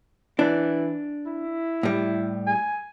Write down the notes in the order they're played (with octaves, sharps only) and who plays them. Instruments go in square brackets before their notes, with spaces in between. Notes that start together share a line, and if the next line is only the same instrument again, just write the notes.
[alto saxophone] E3 [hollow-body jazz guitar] D4
[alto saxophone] E4
[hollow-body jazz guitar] A2 G3
[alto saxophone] G#5